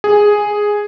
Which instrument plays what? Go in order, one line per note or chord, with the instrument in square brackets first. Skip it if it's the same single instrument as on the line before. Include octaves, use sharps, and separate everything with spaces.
[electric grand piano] G#4